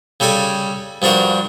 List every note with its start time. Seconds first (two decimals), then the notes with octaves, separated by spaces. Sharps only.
0.20 C#3 G3 A4 G#5 D6
1.02 G2 F3 D4 F#4 A#4